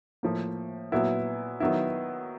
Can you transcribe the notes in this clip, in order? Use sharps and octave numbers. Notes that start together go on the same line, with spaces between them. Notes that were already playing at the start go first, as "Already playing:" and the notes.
A2 F3 A#3
A#2 F#3 B3 E4
D#3 F#3 B3 E4